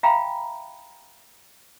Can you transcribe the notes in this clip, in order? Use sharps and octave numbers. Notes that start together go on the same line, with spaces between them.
E5 F5 G5 G#5 A#5 B5